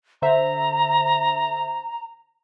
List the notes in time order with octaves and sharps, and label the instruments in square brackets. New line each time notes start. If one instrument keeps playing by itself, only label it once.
[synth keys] D3 C5 E5 [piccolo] A#5